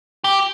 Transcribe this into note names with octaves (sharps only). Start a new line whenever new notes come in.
G4